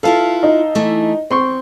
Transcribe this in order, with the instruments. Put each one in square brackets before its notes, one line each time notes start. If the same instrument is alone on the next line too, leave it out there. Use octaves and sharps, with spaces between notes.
[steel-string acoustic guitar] E4 F4 B4 [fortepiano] A4 F5 A5
[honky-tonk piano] D#4
[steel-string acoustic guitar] E3 A3 E4
[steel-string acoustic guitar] E2 [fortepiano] C4 C6 C#6